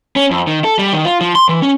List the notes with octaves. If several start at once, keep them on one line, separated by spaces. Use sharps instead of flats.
C#4
F2
D#3
A4
G3
D#3
F4
F3
C6
E3
C#4